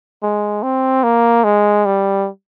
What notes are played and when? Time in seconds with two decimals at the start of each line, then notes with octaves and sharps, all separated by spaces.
0.23 G#3
0.63 C4
1.04 A#3
1.44 G#3
1.86 G3